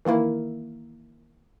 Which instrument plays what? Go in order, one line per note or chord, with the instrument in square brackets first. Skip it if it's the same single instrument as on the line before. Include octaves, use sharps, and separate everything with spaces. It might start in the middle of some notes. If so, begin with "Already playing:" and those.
[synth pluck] D#3 E3 A#3 E4 A#4